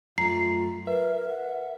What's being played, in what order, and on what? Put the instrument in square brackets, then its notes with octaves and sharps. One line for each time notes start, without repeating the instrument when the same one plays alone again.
[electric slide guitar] F#2 A3 [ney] F4 [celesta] A#5 [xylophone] C7
[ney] A#4 [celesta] B4 [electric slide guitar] E5
[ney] F#5